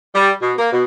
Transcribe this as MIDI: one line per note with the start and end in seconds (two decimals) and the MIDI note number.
0.15 0.31 55
0.41 0.53 47
0.58 0.71 58
0.73 0.84 47